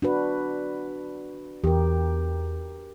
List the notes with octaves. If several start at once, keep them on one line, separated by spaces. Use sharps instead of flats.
D4 F#4 B4
E2 G4 A#4